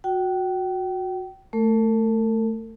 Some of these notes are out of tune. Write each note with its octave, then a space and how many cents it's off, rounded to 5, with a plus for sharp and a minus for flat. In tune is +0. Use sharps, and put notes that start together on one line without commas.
F#4 -20 G5 -30
A3 +0 A#4 -45